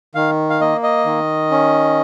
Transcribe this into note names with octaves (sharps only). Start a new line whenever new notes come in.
D#3 F5
F5
A#3 D#5
D#5
D#3
C#4